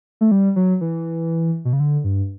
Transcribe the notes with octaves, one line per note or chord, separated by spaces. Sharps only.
A3
G3
F#3
E3
B2
C#3
D3
G2